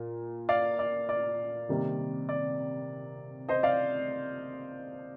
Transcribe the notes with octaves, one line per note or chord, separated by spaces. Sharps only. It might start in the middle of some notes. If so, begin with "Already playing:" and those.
Already playing: A#2
D5 F5
D5
D5
C3 D#3 G3 A#3
D5
C5 D#5
D5 F5